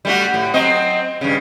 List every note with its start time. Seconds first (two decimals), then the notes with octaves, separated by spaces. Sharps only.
0.05 G3 A3 F#4
0.34 A2
0.53 F#3 C4 D#5
1.21 G2 C#3